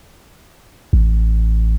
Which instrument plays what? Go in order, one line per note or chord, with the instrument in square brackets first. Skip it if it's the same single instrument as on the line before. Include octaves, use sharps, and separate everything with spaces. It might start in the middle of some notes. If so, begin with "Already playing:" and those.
[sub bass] A1